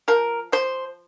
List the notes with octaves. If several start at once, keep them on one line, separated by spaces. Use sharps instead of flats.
F3 A#4
F3 C5